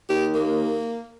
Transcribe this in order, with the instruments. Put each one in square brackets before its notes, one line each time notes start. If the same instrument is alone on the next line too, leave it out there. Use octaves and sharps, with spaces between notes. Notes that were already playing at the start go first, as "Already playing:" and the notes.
[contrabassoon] D#2 [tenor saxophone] G4
[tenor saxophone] A#3